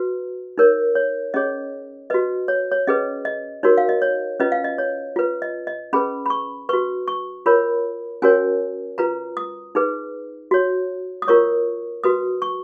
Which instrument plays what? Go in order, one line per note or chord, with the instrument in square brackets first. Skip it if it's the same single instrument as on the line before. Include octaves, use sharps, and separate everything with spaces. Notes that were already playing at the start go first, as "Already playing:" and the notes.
Already playing: [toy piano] F#4 B4
D#4 A#4 C#5
C#5
C#4 G#4 C#5 D#5
F#4 B4 D#5
C#5
C#5
C#4 G#4 B4 D#5
D#5
D#4 F#4 A#4 C#5
F5
D#5
C#5
C#4 F4 B4 D#5
F5
D#5
C#5
F4 B4
D#5
D#5
C#4 G#4 B4 B5
B5
C#6
F#4 B4 C#6
C#6
F4 A#4 C#5 B5
C#4 F#4 A#4 C#5 G#5
F4 B4 A#5
D#6
D#4 G#4 B4
F#4 C#5
D#6
F4 A#4 C#5 C#6
F#4 B4 D#6
C#6